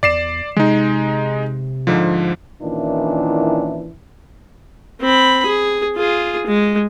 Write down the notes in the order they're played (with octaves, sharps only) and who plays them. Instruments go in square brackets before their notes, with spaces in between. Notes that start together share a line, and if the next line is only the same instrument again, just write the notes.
[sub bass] E2 [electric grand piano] D5 C7 E7
[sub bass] C3 [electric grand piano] G#3 D#4
[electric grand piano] G#2 D3 F3
[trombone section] A#2 D#3 E3 C#4 D4 E4
[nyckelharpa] C4 B5
G#4
F4 G#4
G#3